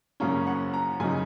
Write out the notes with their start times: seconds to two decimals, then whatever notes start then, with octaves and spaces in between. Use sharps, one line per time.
0.20 F#2 C#3 A#3 C#4 A#5
0.47 F#5
0.74 A#5
1.00 F#2 C#3 F#3 D#4 G#5